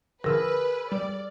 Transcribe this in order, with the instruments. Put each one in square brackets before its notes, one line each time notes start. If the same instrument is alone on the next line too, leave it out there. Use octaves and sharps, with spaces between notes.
[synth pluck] D3 F3 [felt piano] G#4 E6 F6 [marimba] A#4 [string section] B4
[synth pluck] G3 [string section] D5